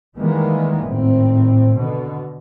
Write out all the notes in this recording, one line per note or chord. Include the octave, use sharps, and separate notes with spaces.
D#3 E3 G3 G#3 A#3 B3
G#1 A2 C4
B2 D3